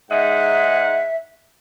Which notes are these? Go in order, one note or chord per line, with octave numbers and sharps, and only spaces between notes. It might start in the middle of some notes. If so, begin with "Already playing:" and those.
G#2 D#5 E5 F#5